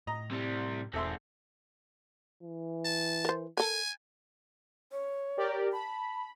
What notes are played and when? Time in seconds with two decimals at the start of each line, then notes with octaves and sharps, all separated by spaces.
0.07 A2 D#5 A#5
0.31 C3 G3
0.94 E1 G#2 C4 A4 E5 C6
2.43 E3
2.85 A5
3.25 A#4 C5
3.57 A4 A#4 G#5
4.92 C#5
5.37 G4 A#4 D5
5.72 A5 B5